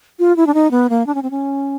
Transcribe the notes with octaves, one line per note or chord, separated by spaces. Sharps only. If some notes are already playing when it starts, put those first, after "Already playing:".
F4
E4
D4
D#4
B3
A#3
D4
C#4
C4
C#4